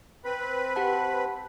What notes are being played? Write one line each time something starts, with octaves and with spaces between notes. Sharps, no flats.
C4 B4 B5
G4 F#5 A5